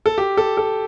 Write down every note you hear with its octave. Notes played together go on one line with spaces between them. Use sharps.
A4
G4
A4
A4